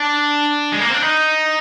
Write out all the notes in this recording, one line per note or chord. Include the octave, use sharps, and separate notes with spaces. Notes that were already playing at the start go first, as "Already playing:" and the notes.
Already playing: D4
G#3
A#3
C4
D4
D#4